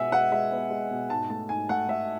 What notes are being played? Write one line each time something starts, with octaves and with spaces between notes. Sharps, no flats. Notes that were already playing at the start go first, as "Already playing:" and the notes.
Already playing: B2 G#3 B3 E5 F#5 G#5
G#3 F#5
G#3 E5
B3
G#3
B2
G#2 A5
A3 A5
G#2 G#5
A3 F#5
A3 E5